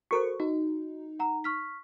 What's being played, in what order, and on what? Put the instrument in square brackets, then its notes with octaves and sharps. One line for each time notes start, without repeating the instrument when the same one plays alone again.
[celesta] F#4 A4 C5 [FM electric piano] A#4 C#6
[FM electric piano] D#4 [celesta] F#4
[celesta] F#5 A#5
C#6 F6 B6